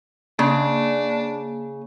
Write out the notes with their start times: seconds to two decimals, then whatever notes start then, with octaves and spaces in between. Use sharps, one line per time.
0.39 C#3 A#3 D4